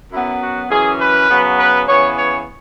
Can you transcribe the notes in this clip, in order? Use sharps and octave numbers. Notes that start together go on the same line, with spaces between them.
F#2 F#3 B3 E4
F#4
F#2 E3 C#4 G#4
B4
C#3 F#3 B3
B4
C#3 E3 B3 C#5
C#5